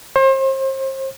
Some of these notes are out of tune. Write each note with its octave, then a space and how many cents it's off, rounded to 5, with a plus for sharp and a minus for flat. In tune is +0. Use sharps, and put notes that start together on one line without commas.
C5 +35